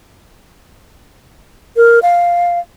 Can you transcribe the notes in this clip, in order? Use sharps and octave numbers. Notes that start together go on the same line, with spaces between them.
A#4
F5